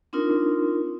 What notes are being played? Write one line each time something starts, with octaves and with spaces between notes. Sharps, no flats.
C4 D4 D#4 F4 A#4